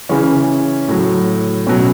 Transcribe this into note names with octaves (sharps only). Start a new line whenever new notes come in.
C#3 E3 C#4
A2 F#3
B2 F#3 C#4